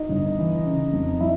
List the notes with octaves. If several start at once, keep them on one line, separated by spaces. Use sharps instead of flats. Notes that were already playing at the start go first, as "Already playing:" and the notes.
Already playing: D#4
G1
E3
C#3
F2
F3 E4